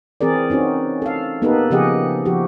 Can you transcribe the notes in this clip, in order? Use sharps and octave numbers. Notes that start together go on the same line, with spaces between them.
E3 C4 G#4 A#4 D5
C4 C#4 D#4 F#4
A4 F5
A#3 B3 D#4 G4 A4 B4
C#3 F3 G4 G#4 D#5 F#5
F3 F#4 G4